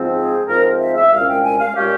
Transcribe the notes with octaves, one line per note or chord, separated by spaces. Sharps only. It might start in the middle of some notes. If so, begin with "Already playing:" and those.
Already playing: G#2 F3 C4
G#4
G#2 F3 C4 A#4
E5
E5
C2 A#2 G#3 C#4 F5
G5
G#5
F5
A#2 G#3 C#4 G4